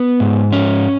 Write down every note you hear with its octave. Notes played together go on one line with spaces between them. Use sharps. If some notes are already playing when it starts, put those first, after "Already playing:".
Already playing: B3
G#2
C#4